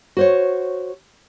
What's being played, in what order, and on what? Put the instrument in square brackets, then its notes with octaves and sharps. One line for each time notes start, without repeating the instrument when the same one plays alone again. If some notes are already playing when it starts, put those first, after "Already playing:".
[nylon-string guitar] F#4 C5 C#5